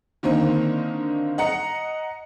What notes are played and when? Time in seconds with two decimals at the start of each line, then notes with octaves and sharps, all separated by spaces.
0.23 D3 D#3 A#3 C4 D#4
1.38 D#5 F#5 A#5 C#7